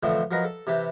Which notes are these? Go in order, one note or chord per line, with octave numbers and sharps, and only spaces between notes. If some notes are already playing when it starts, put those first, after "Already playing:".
F2 A2 D3 E3 F3 C4
F3 F#3 A#4 B4 D#5
A4
C3 E3 G4 B4